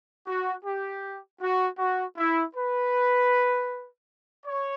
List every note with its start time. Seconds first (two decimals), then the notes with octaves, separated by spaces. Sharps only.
0.27 F#4
0.65 G4
1.41 F#4
1.78 F#4
2.17 E4
2.55 B4
4.46 C#5